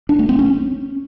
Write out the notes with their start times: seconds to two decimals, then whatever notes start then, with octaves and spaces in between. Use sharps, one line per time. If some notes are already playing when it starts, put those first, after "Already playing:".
0.09 D4
0.19 A3
0.29 C4
0.39 C#4